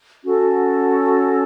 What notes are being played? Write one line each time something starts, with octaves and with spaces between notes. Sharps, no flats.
C#4 F#4 A4